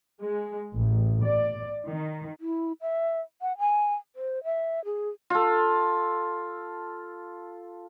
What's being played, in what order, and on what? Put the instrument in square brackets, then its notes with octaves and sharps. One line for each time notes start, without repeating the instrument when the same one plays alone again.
[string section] G#3
A1
D5
D#3
[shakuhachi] E4
E5
F#5
G#5
C5
E5
G#4
[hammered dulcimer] F4 A4